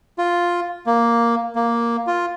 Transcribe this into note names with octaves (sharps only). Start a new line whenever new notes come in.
F4
A#3
A#3
F4